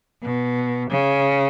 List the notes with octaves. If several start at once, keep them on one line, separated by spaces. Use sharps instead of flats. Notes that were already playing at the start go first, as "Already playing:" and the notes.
B2
C#3